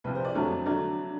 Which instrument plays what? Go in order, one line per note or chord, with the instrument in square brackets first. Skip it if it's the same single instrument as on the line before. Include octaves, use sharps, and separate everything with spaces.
[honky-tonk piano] C2 C3 F3 [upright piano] B4
[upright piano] C5
D5
[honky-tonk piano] F2 D3 F#3 A3 [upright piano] C#5
[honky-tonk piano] D3 F#3 A3 [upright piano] D5